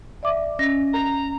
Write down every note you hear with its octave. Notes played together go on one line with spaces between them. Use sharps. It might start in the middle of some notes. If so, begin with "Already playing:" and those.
D5 E5 D6
C#4 D#5 A#6
A#5